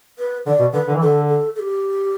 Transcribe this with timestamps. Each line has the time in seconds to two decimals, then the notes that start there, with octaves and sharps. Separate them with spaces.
0.19 B4
0.46 D3 D5
0.59 B2
0.73 D3 B4
0.87 D3
0.95 E3
1.02 D3 A4
1.29 A4
1.56 A4
1.59 G4